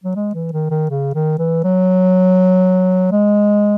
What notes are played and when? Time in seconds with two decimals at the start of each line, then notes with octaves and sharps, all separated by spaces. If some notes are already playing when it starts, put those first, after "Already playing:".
0.04 F#3
0.16 G#3
0.34 E3
0.52 D#3
0.71 D#3
0.90 C#3
1.15 D#3
1.39 E3
1.64 F#3
3.12 G#3